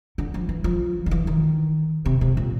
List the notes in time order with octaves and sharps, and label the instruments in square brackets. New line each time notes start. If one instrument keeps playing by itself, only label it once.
[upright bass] D3
F3
E3
F3
D#3
E3
D#3
C3
C3
A#2